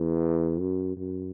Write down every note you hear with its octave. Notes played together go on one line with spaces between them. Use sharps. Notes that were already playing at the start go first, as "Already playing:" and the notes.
Already playing: E2
F#2
F#2